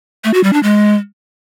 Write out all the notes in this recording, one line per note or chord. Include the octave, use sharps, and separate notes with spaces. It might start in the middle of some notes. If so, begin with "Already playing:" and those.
A3
F#4
G3
D4
G#3